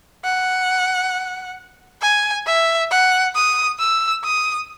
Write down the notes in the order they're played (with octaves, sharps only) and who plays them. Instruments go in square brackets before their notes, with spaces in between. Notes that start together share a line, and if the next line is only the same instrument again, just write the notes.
[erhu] F#5
G#5
E5
F#5
D#6
E6
D#6